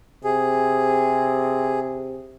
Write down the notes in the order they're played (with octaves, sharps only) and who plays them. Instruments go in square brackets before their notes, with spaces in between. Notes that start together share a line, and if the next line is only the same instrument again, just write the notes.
[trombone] C3 [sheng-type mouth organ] G#4